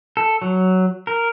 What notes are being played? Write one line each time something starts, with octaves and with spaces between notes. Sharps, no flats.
A4
F#3
A#4